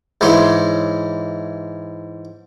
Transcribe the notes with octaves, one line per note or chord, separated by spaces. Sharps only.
G#2 E3 G#3 C#5 C6